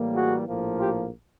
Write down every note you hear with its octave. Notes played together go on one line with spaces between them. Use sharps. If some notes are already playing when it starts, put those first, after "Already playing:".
Already playing: A2 E3 G3 A#3
F#4 G#4
A#1 A2 F3 A#3
F4 G4